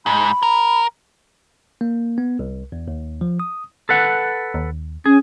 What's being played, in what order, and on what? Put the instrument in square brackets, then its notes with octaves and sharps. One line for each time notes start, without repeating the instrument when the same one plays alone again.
[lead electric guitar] G#2 [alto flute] B5
[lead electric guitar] A#4
[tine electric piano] A#3
B3
C2
E2
D#2
F3
D#6
[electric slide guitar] A4 B4 F#5
[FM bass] D#2
[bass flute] C#4 [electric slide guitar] G#4